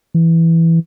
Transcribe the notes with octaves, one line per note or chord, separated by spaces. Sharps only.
E3